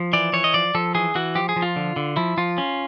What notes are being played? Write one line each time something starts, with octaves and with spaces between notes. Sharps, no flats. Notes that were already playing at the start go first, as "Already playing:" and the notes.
Already playing: F3
E3 D5
E3 C#5
D#5
F3 D5
F3 A4
E3 G#4
E3 F#4
F3 G4
G#4
F3
F4
D3
D3
F3 E4
F3 F4
C#4